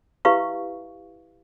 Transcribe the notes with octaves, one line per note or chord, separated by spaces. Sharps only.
E4 G4 B4 E5 F5 C#6